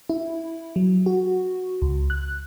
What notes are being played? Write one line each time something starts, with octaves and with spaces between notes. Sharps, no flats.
E4
F#3
F#4
C#2
F#6